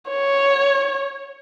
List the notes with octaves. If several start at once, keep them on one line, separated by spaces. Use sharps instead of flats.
C#5